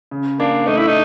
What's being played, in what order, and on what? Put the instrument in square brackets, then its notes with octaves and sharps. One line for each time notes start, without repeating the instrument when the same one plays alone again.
[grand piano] C#3
[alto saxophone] A#3 [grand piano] D4
[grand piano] A3 [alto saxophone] D#4
[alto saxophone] E4
D#4